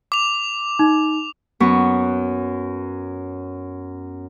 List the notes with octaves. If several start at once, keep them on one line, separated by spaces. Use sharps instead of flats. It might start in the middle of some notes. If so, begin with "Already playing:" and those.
D6 F7
D#4
F#2 B3 C#6